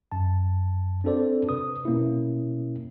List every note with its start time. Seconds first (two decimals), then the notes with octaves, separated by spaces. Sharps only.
0.12 F#2 A5
1.04 C4 D4 F#4 A4 C5 D5
1.49 C3 B4 D#6
1.85 B2 A#3 C#4 E4